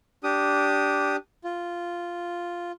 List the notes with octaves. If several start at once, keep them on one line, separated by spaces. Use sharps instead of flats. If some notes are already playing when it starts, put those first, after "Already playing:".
D4 G4 D#6
F4